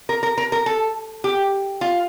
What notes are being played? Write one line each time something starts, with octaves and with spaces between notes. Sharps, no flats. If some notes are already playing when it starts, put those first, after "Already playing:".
A#4
A#4
A#4
A#4
A4
G4
F4